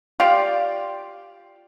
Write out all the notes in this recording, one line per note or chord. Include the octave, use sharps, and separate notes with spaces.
F4 G4 D5